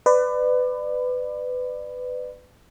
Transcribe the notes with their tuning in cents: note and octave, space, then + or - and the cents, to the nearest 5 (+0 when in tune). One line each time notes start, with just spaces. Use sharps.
B4 +25 D5 +25